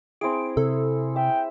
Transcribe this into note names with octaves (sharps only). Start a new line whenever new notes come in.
C4 E4 G#4 D7
C3 A4
E5 G5